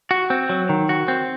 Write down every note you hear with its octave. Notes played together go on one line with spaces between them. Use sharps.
F#4
C4
F#3
D#3
F#4
C4